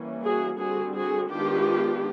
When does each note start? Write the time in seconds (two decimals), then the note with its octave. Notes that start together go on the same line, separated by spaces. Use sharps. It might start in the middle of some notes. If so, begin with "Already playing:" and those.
Already playing: E3 G3 A#3 C#4
0.23 F#4 G#4
0.59 D3 G3 C4 F#4 G#4
0.94 F#4 G#4
1.30 D#3 G#3 B3 D4 F4 G4